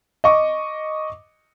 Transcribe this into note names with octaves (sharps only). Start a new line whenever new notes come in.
D#5 C#6 D6